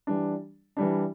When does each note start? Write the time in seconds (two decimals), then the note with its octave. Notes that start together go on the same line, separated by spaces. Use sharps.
0.07 E3 G3 D4
0.77 E3 G3 D4